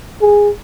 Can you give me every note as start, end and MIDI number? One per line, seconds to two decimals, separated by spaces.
0.21 0.49 68